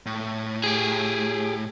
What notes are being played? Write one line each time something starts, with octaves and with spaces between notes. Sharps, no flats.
A2
G4 G#4